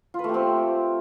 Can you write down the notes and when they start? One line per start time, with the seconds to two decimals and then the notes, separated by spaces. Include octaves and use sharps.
0.14 F4
0.19 B4
0.24 A3
0.29 G4
0.34 C4